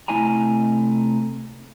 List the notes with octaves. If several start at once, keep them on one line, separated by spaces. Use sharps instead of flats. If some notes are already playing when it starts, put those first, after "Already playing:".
C3 A3 E4 D#5 G#5 A#5